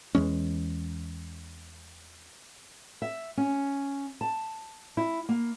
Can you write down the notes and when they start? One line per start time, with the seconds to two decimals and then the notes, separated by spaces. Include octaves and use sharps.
0.15 E2 E3 G#3 C#4
3.02 E5
3.37 C#4
4.21 A5
4.97 E4
5.29 A#3